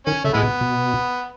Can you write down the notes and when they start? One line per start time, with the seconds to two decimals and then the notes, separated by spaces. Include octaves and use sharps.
0.06 D#3 C#4
0.24 C#3 A3
0.34 A2 E3 G#3 B3
0.43 B2
0.61 B2